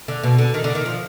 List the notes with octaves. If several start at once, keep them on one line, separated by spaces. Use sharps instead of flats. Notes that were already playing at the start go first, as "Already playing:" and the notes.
D3
B2
D3
D#3
D3
D#3
F3